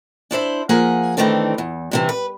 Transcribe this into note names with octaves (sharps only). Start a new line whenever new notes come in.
D4 E4 C5 E5
F3 A#3 G#4 F#5
D#3 E3 A3 C4 D4
E2
G2 C3 E3
B4